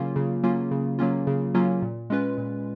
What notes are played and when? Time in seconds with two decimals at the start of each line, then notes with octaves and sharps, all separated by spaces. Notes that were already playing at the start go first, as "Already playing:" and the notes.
Already playing: C#3 F#3 A#3 C#4 F4
0.16 C#3
0.43 F#3 A#3 C#4 F4
0.71 C#3
0.99 F#3 A#3 C#4 F4
1.27 C#3
1.54 F#3 A#3 C#4 F4
1.82 A#2
2.10 G#3 C#4 F4 B4
2.38 A#2